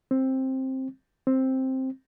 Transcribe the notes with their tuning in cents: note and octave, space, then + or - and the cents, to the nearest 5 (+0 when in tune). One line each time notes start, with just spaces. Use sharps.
C4 +10
C4 +5